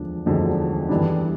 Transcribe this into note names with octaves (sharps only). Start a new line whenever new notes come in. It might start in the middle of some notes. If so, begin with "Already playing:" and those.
Already playing: E1 D2 D3 F3 D4
E1 D2 D3 F3
G2 E3 G3 D4